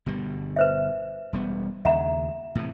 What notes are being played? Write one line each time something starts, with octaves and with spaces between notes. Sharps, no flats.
G1 B2 G3
B4 C5 E5
E1 G3 B3
D#2 C#3 E5 F#5 A#5
A2 C3 E3